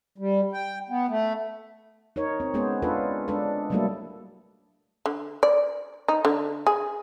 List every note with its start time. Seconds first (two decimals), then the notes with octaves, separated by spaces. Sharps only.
0.18 G3
0.52 G5
0.89 B3
1.09 A3
2.16 D#4 A#4 C#5
2.40 C4
2.54 G#3 B3 C#4 G#4 C5
2.82 D4 F4 A4 B4
3.28 G#3 D4 A4 B4
3.70 F#3 G3 A3 A#3 E4 A4
5.06 D3
5.43 D5
6.08 D#4
6.25 D3
6.67 G#4